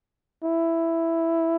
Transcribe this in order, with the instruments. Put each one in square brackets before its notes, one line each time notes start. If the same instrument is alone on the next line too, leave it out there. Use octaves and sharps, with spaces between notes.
[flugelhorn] E4